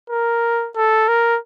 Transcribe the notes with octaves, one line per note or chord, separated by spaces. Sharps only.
A#4
A4
A#4